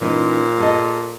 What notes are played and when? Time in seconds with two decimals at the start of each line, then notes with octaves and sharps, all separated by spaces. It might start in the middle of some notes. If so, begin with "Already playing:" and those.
0.01 A#2 E3 C#4 D#4
0.58 G#4 A4 D#5